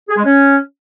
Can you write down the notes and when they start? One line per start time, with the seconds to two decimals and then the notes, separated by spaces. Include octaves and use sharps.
0.09 G#4
0.17 G#3
0.25 C#4